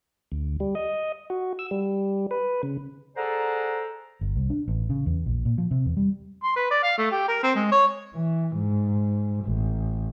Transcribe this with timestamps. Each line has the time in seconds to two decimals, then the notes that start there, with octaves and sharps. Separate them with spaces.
0.32 D2
0.60 G3
0.75 D#5
1.30 F#4
1.59 E6
1.71 G3
2.31 B4
2.63 C#3
3.16 G#4 A4 C5 D5 F#5 A#5
4.21 G1
4.36 C2
4.50 D4
4.68 A1
4.90 C#3
5.06 E2
5.26 A#1
5.45 A#2
5.58 F3
5.71 C3
5.86 E2
5.97 G3
6.43 C6
6.56 B4
6.71 D5
6.83 F5
6.98 A3
7.12 G4
7.28 A#4
7.43 C4
7.55 G#3
7.72 C#5
8.14 E3
8.57 G#2
9.46 A1